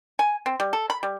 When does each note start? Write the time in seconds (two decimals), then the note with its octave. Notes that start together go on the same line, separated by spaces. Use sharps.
0.19 G#5
0.46 C4
0.60 G3
0.73 A4
0.90 B5
1.03 G3